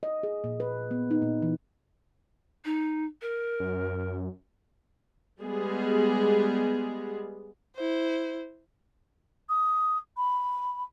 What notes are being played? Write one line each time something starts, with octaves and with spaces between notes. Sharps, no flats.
D#5
G#4
A#2
B4
B3
D#4
A#2
E3
D#4
A#4
F#2
G3 G#3 B3 G#4
E4 C5
D#6
B5